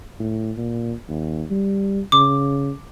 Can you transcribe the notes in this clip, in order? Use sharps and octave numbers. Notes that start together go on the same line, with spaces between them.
A2
A#2
D#2
G3
C#3 D6